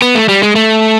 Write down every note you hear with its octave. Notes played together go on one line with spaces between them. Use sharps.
B3
A3
G3
G#3
A3